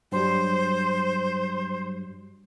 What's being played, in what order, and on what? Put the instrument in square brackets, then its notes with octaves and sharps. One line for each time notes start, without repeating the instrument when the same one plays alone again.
[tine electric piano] G2 F#3 G3 [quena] C5